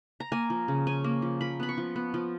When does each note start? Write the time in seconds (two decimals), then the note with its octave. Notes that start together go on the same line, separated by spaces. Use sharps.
0.20 A#5
0.32 A#3 G#5
0.50 F3
0.68 C#3
0.87 C#4 G#5
1.04 A#3
1.22 F3
1.41 F3 B5
1.60 B3 B5
1.69 C#6
1.78 F3
1.96 B3
2.14 F3